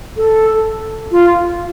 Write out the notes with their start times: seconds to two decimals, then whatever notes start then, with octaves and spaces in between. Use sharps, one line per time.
0.17 A4
1.12 F4